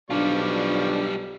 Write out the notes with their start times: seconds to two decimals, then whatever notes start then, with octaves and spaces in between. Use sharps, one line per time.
0.10 B1 F3 G3 D4 F4 D5 C#6